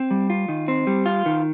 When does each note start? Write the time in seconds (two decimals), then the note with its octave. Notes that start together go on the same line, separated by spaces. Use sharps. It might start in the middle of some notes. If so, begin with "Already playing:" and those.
Already playing: C4
0.11 G3
0.30 F4
0.48 D#3
0.68 C4
0.87 G3
1.06 F4
1.26 D#3